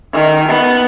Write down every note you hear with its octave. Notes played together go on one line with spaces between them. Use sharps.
D#3
B3